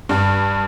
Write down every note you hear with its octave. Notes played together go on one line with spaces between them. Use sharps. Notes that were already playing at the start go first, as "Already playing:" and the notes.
G2